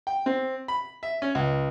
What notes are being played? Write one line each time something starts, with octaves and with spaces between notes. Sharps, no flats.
G5
C4
B5
E5
C#4
C#2